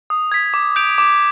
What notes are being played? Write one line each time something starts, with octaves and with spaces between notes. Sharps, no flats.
D#6
G#6 B6
D6
G6 D7 F7
D6